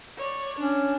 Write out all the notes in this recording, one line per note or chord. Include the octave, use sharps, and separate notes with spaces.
C#5 D5
C#4 D4